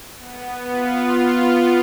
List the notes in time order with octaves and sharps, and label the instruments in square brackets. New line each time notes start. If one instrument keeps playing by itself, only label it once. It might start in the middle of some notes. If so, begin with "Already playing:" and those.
[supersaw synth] B3
F4